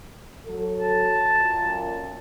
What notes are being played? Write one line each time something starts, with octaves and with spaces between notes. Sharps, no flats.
F#3 A4
A5
F#2 A#2